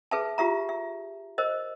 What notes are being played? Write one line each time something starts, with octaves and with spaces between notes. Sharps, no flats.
G#4 B4 E5 A5
F4 G4 E5 A#5
E5
A#4 C5 D#5